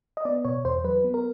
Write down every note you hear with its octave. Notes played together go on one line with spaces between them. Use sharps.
D#5
B3 D5
B2 C#5
E2 C5
F#3 B4
B3
A#4